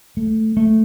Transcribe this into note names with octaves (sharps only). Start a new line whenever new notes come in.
A3
A3